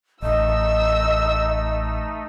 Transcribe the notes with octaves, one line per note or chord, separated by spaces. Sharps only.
A1 A3 D#4 D#5 E6